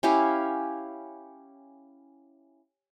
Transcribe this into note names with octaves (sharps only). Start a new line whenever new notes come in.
C#4 E4 G4 F5